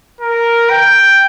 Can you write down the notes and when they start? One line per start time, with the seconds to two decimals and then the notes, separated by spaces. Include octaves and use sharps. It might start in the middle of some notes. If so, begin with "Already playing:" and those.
0.21 A#4
0.70 G5